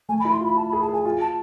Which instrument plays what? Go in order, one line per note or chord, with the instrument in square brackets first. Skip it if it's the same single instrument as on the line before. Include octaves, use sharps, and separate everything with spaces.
[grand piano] A3 [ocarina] G#5
[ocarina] B5
[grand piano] E4
[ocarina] C6
[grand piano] F4
[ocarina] B5
[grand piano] F4 [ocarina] A5
[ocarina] B5
[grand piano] G#4
[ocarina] A5
[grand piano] G#4
[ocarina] G#5
[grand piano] F4 [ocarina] G#5
[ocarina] A5